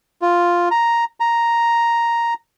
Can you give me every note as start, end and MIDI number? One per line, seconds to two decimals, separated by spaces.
0.22 0.69 65
0.71 1.04 82
1.20 2.34 82